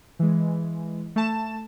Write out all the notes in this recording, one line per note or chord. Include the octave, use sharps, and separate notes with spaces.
E3 G#3
A3 A5 E7